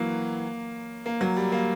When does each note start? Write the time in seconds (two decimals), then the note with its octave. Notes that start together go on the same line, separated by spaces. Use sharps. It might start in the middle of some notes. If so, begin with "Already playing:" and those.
Already playing: E3 F#3 A#3
1.06 A#3
1.21 F#3
1.36 G3
1.52 A#3